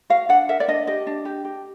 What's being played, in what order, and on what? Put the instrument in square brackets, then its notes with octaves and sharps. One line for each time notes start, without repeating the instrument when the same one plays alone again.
[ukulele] F#4 F5
D4 F#5
A#4 E5
D5
D4 D#5
G4 D#5
D4
G4
G4